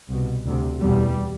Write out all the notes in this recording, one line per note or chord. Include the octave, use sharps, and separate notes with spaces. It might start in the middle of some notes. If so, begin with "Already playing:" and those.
C2 B2
D2 C3
E2 B2 G3